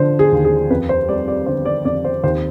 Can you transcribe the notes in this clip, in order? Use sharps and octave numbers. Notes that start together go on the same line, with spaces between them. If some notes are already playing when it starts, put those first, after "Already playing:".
Already playing: D3 F3 C5
G#4
D#2
G#4
F2 B4
C5
G3 D5
D5
D3 C5
D5
F2 D5
C5
D#2 C5